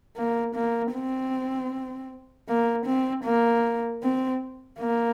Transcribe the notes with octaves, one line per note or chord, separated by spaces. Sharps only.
A#3
A#3
C4
A#3
C4
A#3
C4
A#3